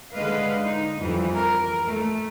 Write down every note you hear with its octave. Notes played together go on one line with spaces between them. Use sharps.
D3 G#3 B4 D#5 F5
D#4
F2 E3 G3
A#4
A3